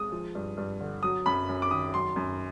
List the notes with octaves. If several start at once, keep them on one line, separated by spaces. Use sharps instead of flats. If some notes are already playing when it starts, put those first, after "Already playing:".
Already playing: G#3 D#6
F3
G2
G2
D3
F#3 D#6
F#2 B5
F#2
D6
D#3 D#6
F#3 C6
F#2